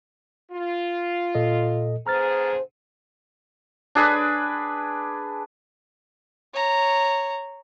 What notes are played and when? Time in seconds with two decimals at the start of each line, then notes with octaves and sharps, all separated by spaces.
0.52 F4
1.35 A#2 A4 D#5
2.07 D3 B3 G#4 C5 A#5 F6 A6
3.95 D4 G#4 B4
6.54 C#5 A#5